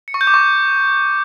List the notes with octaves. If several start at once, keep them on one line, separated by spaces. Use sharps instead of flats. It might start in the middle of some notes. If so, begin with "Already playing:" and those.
C#7
C#6
G6
D6
C#6